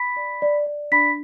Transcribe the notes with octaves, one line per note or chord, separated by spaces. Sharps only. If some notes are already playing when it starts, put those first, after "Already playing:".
Already playing: B5 B6
D5
D5
D5
D4 B5 B6